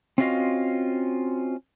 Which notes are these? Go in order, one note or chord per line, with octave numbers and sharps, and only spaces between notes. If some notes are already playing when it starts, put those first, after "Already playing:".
C4 C#4 F4 F#4 D#5 F5